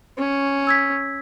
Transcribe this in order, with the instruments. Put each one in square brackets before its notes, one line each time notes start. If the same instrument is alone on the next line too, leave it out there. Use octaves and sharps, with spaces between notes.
[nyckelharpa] C#4
[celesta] E6 G#6 B6